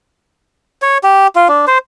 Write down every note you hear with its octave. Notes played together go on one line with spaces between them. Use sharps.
C#5
G4
F4
D4
C5